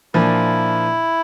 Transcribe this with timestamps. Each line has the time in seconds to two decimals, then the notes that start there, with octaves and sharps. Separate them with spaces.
0.14 A#2 F3 A#3 D4 E4